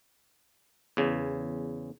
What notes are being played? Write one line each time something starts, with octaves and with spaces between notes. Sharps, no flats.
E2 C#3